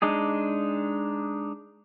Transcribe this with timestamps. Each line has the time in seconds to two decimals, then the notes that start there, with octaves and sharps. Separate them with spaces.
0.02 G#3 D4 D#4 G#4